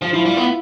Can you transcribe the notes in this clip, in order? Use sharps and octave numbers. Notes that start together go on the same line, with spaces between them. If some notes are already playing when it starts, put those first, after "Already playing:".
F3 F4
F3 E4
G3 F4
B3